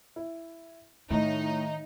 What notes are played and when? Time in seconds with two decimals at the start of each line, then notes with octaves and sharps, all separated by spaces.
0.16 E4
1.10 A2 D#3 A3 D#4